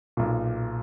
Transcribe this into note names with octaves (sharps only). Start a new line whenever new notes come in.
B1 A#2